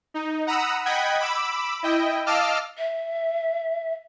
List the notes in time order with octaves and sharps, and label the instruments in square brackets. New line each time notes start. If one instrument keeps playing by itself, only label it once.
[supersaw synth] D#4
F#5 A#5 B5 D#6 E6
D#5 F#5 G5 B5 G#6 B6
B5 D6 E6
E4 D#5 G5
D#5 F5 A5 D6 E6 F6
[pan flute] E5